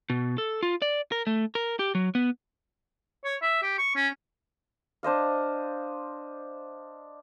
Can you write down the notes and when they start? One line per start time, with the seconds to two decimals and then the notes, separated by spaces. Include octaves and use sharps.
0.10 B2
0.38 A4
0.63 F4
0.82 D5
1.12 A#4
1.27 A3
1.55 A#4
1.79 G4
1.95 F#3
2.15 B3
3.24 C#5
3.42 E5
3.63 G4
3.78 C#6
3.96 C#4
5.03 D4 C5 D#5 F5